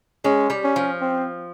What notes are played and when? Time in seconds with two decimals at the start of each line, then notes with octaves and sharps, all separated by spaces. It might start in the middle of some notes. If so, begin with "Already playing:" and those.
0.24 G#3 C#4
0.50 G3
0.64 C#4
0.76 F3
1.01 C4